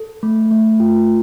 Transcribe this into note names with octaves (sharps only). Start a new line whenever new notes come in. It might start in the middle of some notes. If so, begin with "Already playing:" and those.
Already playing: A4
A3
A3
F4